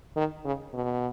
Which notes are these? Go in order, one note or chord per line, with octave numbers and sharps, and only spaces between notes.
D#3
C#3
B2